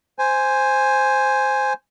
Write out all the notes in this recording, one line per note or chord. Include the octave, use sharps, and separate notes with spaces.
C5 G#5